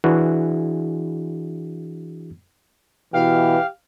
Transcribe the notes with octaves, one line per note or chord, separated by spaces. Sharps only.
E3 D4 E4 F#4 G#4
B2 E3 G4 F5